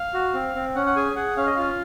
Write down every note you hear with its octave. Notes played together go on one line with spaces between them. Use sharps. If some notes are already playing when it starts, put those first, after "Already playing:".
Already playing: F5
F#4
C4
C4
C#4 F#5
F#5
G#4 G#5
G#4 F#5
C#4 F5
D#5
F4 F5